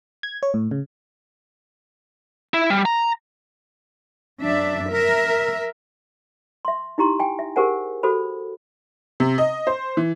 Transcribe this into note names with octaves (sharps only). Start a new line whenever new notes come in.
G#6
C#5
A2
C#3
E4
G3
A#5
F#2 D4 E5
A#4 E5
E5 C6
D#4 E4 G4 A#5 C6
G5 G#5
E5
G4 G#4 A#4 C5 F#5 G#5
F#4 A4 C5 B5
C3
D#5
C5
E3